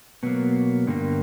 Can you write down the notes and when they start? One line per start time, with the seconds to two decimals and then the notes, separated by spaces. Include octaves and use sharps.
0.23 B2 F#3 A#3 B3
0.87 G2 D3 G3 A#3